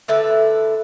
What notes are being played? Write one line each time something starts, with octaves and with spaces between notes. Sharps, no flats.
D3 A3 E4 B4